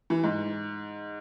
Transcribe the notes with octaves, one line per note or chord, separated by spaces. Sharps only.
E3
G#2